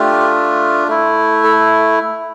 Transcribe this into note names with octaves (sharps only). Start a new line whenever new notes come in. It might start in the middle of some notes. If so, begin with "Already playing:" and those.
Already playing: A3 D4 F4 G4
A3 E4
A4